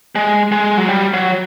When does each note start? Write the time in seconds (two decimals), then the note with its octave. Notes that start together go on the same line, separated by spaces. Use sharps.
0.15 G#3
0.52 G#3
0.78 F#3
0.89 G3
1.13 F#3